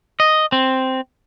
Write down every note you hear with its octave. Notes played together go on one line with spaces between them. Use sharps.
D#5
C4